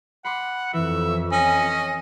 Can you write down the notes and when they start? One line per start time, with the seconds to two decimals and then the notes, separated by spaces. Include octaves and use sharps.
0.25 F#5 B5 C6 D6
0.73 F2 E3 E5
1.32 C#4 D#5